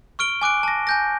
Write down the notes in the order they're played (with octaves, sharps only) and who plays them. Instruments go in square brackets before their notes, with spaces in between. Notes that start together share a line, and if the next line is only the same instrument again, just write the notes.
[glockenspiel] C#6 F6 D7 G7
G#5 D6 F#6 D7
A5 A#6
G#5 G6 A#6